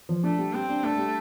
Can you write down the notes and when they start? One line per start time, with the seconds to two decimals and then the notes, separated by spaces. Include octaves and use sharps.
0.09 F3
0.23 A3 D4
0.38 G3
0.53 G3 C4
0.68 D4
0.83 A3 D4
0.98 G3